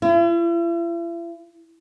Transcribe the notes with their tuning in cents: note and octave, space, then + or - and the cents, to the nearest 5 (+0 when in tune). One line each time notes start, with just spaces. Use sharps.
E4 +45